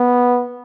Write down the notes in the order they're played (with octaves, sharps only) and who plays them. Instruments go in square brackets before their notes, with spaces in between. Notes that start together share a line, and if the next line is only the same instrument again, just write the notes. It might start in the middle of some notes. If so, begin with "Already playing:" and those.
Already playing: [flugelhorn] B3